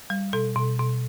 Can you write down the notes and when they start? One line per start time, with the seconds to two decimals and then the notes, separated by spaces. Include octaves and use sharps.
0.10 G3
0.33 B2 A4
0.56 B2
0.79 B2